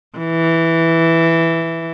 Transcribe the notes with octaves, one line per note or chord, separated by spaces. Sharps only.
E3